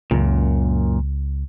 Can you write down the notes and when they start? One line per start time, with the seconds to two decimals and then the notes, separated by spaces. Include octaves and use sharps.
0.11 C#2 F#2 A#2